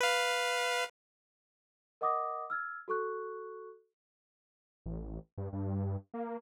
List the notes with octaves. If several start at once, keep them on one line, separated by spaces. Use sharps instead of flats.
B4 F5
A#4 D#5 F#5 D6 D#6 A#6
E6 F6 G#6
F#4 A4 C#6 F#6
A1
G2
G2
A#3